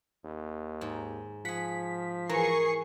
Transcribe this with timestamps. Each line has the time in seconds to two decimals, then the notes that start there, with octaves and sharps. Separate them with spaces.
0.24 D#2
0.81 G#2
1.45 F3 G#4 F#5 B6
2.29 E3 G#4 A#4 C#6 C7